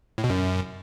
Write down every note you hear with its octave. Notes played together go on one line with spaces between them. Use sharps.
A2
B2
F#2